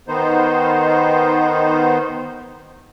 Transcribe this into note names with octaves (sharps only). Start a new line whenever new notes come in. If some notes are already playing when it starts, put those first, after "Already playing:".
D#3 B3 D#4 C5